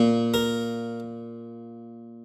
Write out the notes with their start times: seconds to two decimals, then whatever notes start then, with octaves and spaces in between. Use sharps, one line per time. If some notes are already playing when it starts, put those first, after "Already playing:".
Already playing: A#2
0.34 A#4